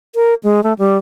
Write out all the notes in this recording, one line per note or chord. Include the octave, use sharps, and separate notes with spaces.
A#4
G#3
A3
G3